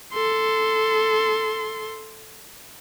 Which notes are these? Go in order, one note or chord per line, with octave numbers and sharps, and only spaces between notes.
A4 C6